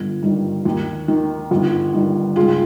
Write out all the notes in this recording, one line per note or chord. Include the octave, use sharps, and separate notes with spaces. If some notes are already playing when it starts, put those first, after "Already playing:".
Already playing: G1
G2 D#3
D#2
D#3
G1
G2 D#3
C#2 F4 G#4